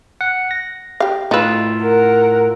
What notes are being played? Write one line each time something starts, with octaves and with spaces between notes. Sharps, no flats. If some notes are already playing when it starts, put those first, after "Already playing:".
F#5
A#6
G4 F5
A2 D#4 F4 B4 E6
A#4 F#5